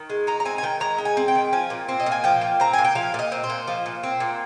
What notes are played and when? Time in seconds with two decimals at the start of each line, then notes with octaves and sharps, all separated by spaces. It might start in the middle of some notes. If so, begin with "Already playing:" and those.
Already playing: D#3
0.10 G#3
0.27 D#4 A#5
0.40 A#5
0.45 C4 G#5
0.58 G#5
0.63 D#3 G5
0.80 G#3 A#5
0.98 D#4
1.05 G#5
1.17 C4
1.28 G5
1.35 D#3
1.52 F3 G#5
1.70 A#2
1.88 C4
2.00 D#5
2.06 A#2
2.12 G#5
2.24 F3 G5
2.41 A#2
2.60 C4 A#5
2.73 A#2 G#5
2.84 G5
2.95 F3 F5
3.14 A#2 D#5
3.32 C4
3.44 C5
3.50 A#2
3.67 F3
3.86 A#2
4.03 C4
4.20 A#2